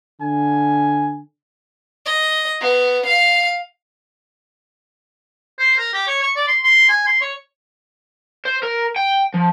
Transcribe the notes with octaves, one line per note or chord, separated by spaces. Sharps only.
D3 G#5
D#5
B3
F5
C5
A#4
G4
C#5
C#6
D5
C6
C6
G#5
C6
C#5
C5
A#4
G5
F3